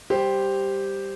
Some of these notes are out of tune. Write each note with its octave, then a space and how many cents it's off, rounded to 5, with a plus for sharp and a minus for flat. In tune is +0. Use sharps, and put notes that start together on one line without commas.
G3 +5 G4 +0 C5 +0